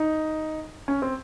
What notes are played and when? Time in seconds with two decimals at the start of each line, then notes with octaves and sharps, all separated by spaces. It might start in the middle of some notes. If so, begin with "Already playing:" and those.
Already playing: D#4
0.88 C#4
1.02 C4